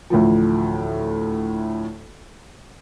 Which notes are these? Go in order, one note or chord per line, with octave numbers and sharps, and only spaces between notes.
D2 A2 E3 F3